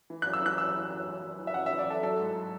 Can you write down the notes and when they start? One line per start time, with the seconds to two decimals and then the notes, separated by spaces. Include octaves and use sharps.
0.10 E3
0.22 F#2 F#6
0.33 E6
0.42 E3 F#6
0.58 F#2 E6
0.74 E3
0.91 F#2
1.07 E3
1.23 F#2
1.39 E3
1.47 E5
1.54 F#2 F#5
1.66 E5
1.71 E3
1.79 D5
1.87 F#2 A4
2.03 F#3 A4
2.19 G#2
2.35 F#3